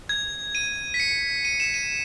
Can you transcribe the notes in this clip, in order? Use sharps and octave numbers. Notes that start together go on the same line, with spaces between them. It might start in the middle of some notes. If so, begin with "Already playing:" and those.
G#6
D#7
B6
C#7
D#7
E7
D#7